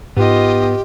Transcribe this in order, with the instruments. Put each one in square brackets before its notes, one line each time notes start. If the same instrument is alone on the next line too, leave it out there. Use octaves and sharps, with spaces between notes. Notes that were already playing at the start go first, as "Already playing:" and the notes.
[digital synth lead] G#2 [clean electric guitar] B3 [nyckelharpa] F4 D#5 [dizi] G4